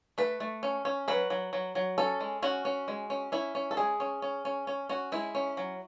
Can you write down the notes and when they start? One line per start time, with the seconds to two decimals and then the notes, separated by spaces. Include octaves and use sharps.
0.18 A3 B4
0.40 A3
0.63 C#4
0.85 C#4
1.08 F#3 B4
1.30 F#3
1.53 F#3
1.75 F#3
1.98 C#4 A4
2.20 G#3
2.42 C#4 F#4
2.65 C#4
2.88 G#3
3.10 C#4
3.32 C#4 E4
3.55 C#4
3.71 A4
3.77 G#3 G#4
4.00 C#4
4.22 C#4
4.45 C#4
4.67 C#4
4.89 C#4 F#4
5.12 G#3 E4
5.35 C#4
5.57 F#3